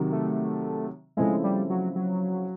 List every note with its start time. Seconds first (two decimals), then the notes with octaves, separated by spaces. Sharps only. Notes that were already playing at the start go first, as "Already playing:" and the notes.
Already playing: C3 D#3 F#3
0.12 A3
1.17 C#3 F3 G#3 A3 C4 E4
1.44 G3
1.70 F#3
1.96 F#3